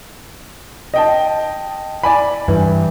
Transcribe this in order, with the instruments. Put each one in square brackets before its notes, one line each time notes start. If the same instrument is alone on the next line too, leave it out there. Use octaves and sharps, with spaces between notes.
[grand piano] D#5 G5 A5
D5 G#5 B5
[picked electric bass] G2 [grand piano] E3